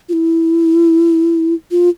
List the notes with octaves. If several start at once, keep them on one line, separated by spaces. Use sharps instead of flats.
F4
E4
F4